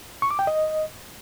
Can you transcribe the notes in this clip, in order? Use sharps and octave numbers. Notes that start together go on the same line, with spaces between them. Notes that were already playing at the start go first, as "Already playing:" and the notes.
C#6
D6
G5
D#5